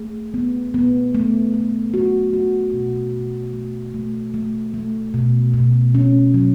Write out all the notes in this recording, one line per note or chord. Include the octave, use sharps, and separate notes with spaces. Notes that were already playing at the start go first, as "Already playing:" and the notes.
Already playing: A3 G#4
B3
B3
A3
A3
F#4
F#4
B2
B2
A3
A3
A3
A3
B2
B2
C#4
F#3